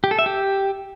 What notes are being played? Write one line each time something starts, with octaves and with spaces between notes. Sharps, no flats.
G4
A4
E5
G4